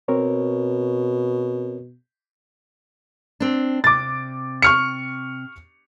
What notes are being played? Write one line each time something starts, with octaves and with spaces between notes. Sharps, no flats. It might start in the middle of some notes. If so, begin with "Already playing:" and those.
B2 C4 A#4 C#5
C4 D4
C3 D6 A6
C#6 F6 C#7